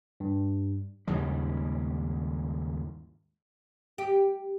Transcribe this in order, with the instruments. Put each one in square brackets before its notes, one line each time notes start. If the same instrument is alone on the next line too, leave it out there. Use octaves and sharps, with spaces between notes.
[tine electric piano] G2
[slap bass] D#2 G#2 C#3 G3
[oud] G4